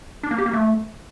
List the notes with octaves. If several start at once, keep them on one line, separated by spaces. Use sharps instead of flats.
D4
A#3
G4
A#3
A3